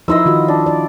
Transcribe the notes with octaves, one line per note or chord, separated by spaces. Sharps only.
F3 D#4 E4 D#5 C6 E6
D#3 F4 F#4
D4
D5